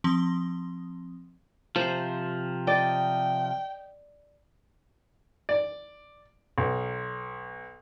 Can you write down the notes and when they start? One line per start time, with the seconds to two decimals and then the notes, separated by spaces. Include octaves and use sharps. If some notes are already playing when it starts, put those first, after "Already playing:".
0.04 F3 C4 C6 D#6 G7
1.76 C3 F3 C5
2.67 D5 D#5 G5
5.49 D5
6.58 B1